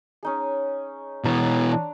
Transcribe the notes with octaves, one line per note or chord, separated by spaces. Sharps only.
C#4 D#4 G#4
B2 E3 C#5 A#5 C6
D4